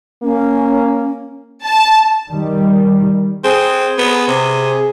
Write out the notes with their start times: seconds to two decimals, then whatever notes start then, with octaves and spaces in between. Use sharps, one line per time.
0.23 A#3 C#4
1.65 A5
2.28 D#3 G3
3.44 C4 G#4
3.98 B3
4.27 C3